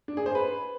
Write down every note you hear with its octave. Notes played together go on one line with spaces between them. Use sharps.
D4
G#4
C5
B4